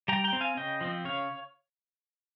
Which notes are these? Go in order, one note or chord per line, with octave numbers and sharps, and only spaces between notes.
G3 G5 A#5
G5 A#5
C4
F5 G#5
C#3 D#5 G5
F3 C4
C#3 C#5 F5